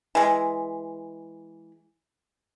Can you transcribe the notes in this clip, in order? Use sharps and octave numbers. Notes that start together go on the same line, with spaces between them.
E3 G#3